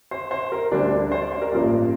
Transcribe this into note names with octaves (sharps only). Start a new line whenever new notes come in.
C5
C5
A#4
D2 D3 G3 D4
D4
C5
D5
C5
A#4
A1 G2 F3 A#3 D5